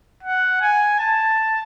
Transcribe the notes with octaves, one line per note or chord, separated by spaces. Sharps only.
F#5
G#5
A5